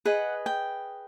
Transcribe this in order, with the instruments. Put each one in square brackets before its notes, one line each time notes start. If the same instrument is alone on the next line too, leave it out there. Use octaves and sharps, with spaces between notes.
[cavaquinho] G#4 B4 D#5 F#5
G5